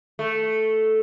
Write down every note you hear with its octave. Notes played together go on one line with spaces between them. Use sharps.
A3